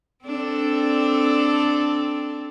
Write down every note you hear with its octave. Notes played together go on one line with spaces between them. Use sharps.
C4 D4 A4